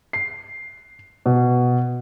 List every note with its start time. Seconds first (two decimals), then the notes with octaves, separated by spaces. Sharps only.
0.13 C7
1.26 B2